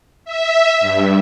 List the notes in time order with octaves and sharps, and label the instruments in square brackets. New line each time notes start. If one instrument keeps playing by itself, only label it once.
[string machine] E5
G2